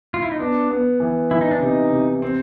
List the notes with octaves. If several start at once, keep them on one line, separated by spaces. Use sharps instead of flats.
F4
E4
D#4
B3 D4
B3
E3
E3 E4
D#4
D4
C3 D#4
C3
C4